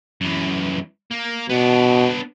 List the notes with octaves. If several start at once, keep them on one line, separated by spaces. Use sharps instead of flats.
F#2 E3
A#3
B2 B3 D4